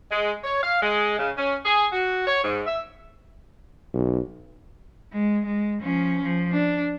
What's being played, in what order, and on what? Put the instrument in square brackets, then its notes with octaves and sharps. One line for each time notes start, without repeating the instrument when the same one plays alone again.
[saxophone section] G#3
C#5
F5
G#3
C#3
C#4
G#4
F#4
C#5
G#2
E5
[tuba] B1
[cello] G#3
G#3
F3 C#4
F3
D4